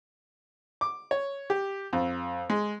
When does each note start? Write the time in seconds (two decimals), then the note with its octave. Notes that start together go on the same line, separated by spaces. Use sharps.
0.81 D6
1.11 C#5
1.50 G4
1.93 F2
2.50 G#3